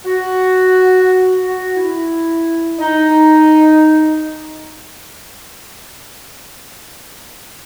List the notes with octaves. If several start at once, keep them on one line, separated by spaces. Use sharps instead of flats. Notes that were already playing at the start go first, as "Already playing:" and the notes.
F#4
F#4
E4
D#4